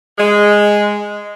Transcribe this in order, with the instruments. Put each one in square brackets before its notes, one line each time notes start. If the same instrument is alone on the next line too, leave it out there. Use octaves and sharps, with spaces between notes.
[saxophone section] G#3